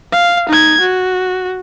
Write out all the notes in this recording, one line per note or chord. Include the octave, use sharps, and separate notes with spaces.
F5
D#4 G#6
F#4